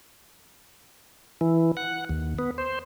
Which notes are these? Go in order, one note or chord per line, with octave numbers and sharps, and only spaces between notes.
E3
F#5
D#2
B3
C5